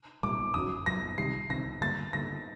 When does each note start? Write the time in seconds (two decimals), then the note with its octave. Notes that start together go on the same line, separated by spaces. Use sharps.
0.23 C2 A#2 G3 A#3 D6
0.54 F#1 F#2 F#3 D#6
0.86 F#1 F#2 F#3 A#6
1.18 C2 C3 D#3 G3 C7
1.49 C2 C3 D#3 G3 A#6
1.81 G2 D3 G3 A#3 A6
2.13 G2 D3 G3 A#3 A#6